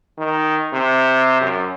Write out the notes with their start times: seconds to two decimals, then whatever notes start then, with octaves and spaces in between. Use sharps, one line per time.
0.18 D#3
0.73 C3
1.41 F#2